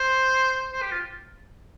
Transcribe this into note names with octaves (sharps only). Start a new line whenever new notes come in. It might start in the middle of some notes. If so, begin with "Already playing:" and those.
Already playing: C5
C5
G4
F4